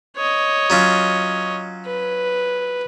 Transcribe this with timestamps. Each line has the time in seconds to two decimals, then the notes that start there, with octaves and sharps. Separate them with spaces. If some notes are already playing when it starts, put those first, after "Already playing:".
0.17 C#5 D#5
0.70 F#3 C#4 F4
1.86 B4